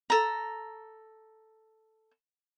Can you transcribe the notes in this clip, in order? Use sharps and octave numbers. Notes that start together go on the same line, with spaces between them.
A4 A#5